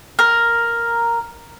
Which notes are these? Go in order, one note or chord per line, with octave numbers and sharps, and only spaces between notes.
A#4